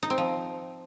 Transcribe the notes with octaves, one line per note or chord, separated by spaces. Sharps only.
D#4
C4
F3